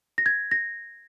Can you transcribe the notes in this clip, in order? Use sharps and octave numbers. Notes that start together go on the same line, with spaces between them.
A#6
G#6
A#6